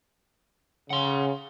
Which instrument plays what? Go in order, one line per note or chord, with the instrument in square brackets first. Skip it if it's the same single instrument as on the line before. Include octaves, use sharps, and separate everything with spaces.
[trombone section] C#3 [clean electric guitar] F#5 C6